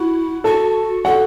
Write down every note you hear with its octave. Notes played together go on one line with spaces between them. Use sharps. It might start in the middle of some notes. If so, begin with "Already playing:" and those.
Already playing: E4 F#4
F#4 A4 A5
F#4 A4 F#5